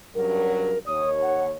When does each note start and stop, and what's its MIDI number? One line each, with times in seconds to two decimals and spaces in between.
0.15 0.78 43
0.15 0.78 49
0.15 0.78 54
0.15 0.79 70
0.86 1.56 39
0.86 1.56 73
0.86 1.09 87
1.22 1.45 78